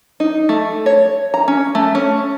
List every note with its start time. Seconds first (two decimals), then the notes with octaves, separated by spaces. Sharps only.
0.20 D#4
0.49 A3
0.86 C#5
1.34 A#5
1.48 C#4
1.75 A3
1.95 C#4